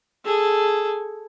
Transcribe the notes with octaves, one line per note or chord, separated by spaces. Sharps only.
G#4 A4